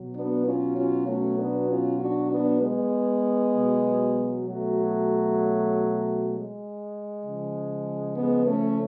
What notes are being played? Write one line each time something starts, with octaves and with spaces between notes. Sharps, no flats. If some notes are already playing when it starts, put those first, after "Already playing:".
Already playing: B2 F#3
B3 D4
C#4 F4
C#4 F4
A3 C#4
B3 D4
C#4 F4
D4 F#4
B3 D4
G#3 B3
B2 F#3
F#3 A3
G#3
C#3 F3
G#3 B3
A3 C#4